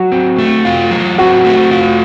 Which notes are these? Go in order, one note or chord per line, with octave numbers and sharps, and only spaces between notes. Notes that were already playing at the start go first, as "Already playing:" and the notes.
Already playing: F#3 F#4
C4
A3
F4
F#3
C4 F#4
A3
F4